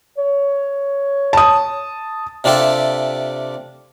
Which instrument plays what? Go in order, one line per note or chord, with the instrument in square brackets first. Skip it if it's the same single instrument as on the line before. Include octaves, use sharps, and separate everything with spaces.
[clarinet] C#5
[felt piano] A5 D#6
[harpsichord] C3 D4 F4 G4 A4 E5